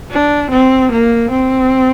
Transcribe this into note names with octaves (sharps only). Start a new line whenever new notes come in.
D4
C4
A#3
C4